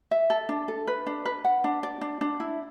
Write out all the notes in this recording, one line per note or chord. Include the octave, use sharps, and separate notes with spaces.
E5
A4
D4
A4
B4
D4
B4
F#5
D4
D5
D4
D4
E4